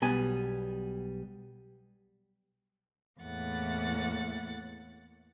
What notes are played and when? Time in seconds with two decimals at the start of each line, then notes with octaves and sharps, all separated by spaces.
0.02 B1 G3 B3 G#5
3.20 E2 A2 A#3 F#5 A6